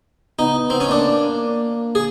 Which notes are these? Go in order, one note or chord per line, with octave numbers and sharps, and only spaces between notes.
B3 D#4
C4
C#4
A#3 D4
G#4